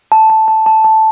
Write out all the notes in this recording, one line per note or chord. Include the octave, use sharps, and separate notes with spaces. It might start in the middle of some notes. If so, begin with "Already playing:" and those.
A5
A5
A5
A5
A5